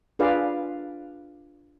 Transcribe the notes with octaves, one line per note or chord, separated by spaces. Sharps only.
D4 F4 G#4 B4 D5 F5